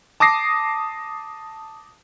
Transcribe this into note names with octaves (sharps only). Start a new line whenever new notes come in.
A5 D6 D#6 A#6 C7